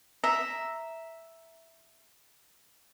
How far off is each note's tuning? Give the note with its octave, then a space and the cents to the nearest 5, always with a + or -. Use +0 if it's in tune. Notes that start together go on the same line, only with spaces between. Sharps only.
E5 +0 A#5 +0